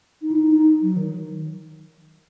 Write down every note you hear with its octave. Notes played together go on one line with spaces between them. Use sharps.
D#4
E4
D#4
D#4
F#3
D#3